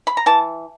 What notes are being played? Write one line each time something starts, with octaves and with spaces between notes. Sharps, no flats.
B5
A#5
E3 A5